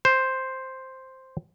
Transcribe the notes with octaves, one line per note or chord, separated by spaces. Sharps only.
C5